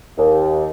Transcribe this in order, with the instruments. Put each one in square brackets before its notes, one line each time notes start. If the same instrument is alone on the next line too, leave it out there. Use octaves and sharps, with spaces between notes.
[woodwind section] D#2